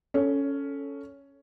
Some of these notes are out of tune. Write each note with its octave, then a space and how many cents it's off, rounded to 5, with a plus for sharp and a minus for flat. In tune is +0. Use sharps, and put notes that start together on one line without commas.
C#4 +5 A4 +0